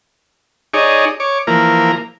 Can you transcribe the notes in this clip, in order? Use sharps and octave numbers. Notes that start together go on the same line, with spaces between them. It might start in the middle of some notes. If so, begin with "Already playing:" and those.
D#4 G#4 C#5 D5
C#5 D6
E3 F3 A#3 A#4